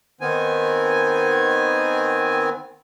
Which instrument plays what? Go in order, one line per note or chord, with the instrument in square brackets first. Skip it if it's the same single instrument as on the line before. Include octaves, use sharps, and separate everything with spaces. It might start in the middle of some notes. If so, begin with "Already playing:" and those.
[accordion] D#3 B3 C4 G#5